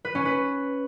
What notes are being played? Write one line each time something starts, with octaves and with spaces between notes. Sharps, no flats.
B4
C#4
B4